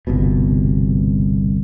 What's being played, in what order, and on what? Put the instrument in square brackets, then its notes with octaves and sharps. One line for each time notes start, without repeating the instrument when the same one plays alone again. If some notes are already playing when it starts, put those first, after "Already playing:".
[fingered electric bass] G1 C2 B2